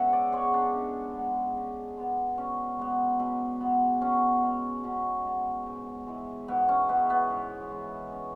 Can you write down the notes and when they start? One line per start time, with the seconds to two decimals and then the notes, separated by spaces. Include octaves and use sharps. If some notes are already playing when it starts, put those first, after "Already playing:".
Already playing: C#3 G#3 B3 G#4 E5 F#5
0.13 D5
0.32 G#3 B3 C#5
0.54 D4
0.74 C#3
1.14 G#3 B3
1.56 C#3
1.97 G#3 B3
2.37 B2 C#4
2.79 G#3 B3
3.20 B2
3.61 G#3 B3
4.01 B2 C#4
4.43 G#3 B3
4.83 B2 C#4
5.25 G#3 B3
5.66 G#2
6.07 E3 G#3
6.48 G#2 B3
6.68 C#4
6.88 E3 G#3 B3
7.10 B3
7.30 G#2
7.71 E3 G#3
8.12 C#4